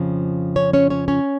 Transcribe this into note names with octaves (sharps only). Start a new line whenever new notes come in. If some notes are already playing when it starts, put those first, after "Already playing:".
Already playing: F2 C#3 F3
C#4 C#5
C#4 C#5
C#4 C#5
C#4 C#5